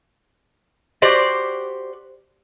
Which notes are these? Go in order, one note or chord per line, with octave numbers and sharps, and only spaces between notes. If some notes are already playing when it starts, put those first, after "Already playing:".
F#4 G4 C5 D5